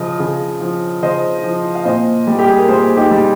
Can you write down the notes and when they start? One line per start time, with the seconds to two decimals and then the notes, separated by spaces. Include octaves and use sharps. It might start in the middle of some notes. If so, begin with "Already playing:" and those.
Already playing: C#3 F3 D#5
0.20 C#3
0.60 F3
1.02 C#3 C5 D#5
1.44 F3
1.75 F5
1.85 A#2 C5 D#5
2.27 G3
2.39 G4
2.49 G#4
2.58 A#4
2.68 A#2 G#4 C5
2.96 D#4 G4
3.11 G3